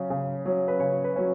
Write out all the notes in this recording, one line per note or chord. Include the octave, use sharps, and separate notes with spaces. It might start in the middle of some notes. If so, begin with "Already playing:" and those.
Already playing: C#3 F#3 C#4
C#3
F#3 C#4
B4
C#3 C#5
B4
F#3 C#4